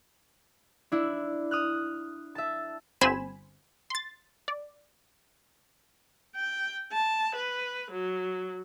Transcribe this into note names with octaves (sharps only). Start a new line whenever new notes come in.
D4 E4
D#6 F6 F#6
E5 A5
G1 C4 C5 G#5 B5 E7
C6 A6
D5
G5
A5
B4
F#3